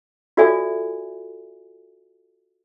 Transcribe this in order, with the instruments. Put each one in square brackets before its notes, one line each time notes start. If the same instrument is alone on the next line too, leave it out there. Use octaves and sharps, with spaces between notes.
[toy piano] F4 F#4 A4 D5 E5 G#5